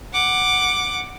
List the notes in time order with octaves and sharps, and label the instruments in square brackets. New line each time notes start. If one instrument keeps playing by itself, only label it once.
[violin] F#5 D6